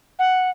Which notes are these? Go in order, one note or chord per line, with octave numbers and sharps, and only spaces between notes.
F#5